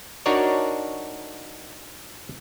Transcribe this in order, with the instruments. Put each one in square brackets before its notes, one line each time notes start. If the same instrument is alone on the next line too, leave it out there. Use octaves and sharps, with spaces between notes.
[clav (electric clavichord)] D4 D#4 F#4 A#4 C#5 D5